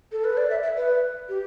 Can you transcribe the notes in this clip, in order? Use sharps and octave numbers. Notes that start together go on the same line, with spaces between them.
A4
B4
D5
E5
E5
B4
G4